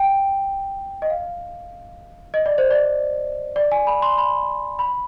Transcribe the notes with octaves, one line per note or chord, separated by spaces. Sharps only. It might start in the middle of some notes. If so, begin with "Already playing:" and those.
Already playing: G5
D#5
F5
D#5
D5
C5
D5
D5
G#5
B5
C6
B5
B5